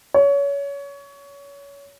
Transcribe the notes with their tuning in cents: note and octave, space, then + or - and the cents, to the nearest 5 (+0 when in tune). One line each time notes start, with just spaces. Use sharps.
C#5 +25